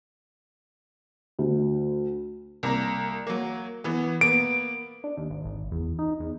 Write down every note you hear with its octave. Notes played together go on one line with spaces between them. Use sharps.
D2
C2 A#3 A#5
F#3 A#3
E3 B3
A#3 B3 D7
D4
D#2
G#1
G#1
E2
D#4
E2